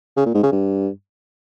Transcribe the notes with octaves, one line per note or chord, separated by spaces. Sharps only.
C#3
A#2
G#2
C#3
G2